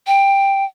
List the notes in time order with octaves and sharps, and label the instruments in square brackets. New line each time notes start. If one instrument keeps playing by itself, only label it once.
[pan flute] G5